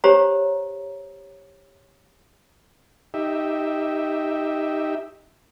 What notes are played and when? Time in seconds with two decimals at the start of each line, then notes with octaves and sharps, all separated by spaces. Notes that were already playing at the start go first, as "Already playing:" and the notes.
0.04 G4 C5 C#5 A#5
3.14 D#4 G4 E5